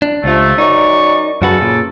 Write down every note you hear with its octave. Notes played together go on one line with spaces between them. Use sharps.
D4
C#2 C3 F3 A3 F4
F#2 D#4 D5 C#6
F#2 C#3 F#4 A4 B4
A#2